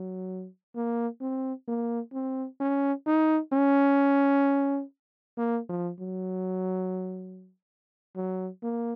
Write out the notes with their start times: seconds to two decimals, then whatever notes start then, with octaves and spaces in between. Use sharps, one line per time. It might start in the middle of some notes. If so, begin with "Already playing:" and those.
Already playing: F#3
0.75 A#3
1.21 C4
1.68 A#3
2.14 C4
2.60 C#4
3.06 D#4
3.52 C#4
5.38 A#3
5.69 F3
6.00 F#3
8.16 F#3
8.63 A#3